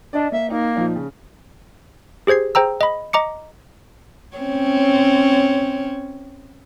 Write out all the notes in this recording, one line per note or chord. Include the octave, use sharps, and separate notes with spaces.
D4 D5 D#5
A#3 E5
A#3 D#4
A#2 F3 D#4
C#3
G4 G#4 C5 G#6 C7
G#4 C5 G5 A#5 E6
D#5 B5
D#5 A#5 D6 C#7
C4 C#4 C#5